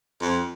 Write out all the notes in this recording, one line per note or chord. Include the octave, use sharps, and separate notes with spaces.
F2